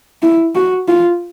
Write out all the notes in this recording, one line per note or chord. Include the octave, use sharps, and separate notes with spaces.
E4
F#4
F4